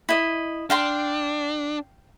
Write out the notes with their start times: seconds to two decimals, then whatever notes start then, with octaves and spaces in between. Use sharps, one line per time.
0.09 E4 D#5
0.70 D4 F5 G5 C6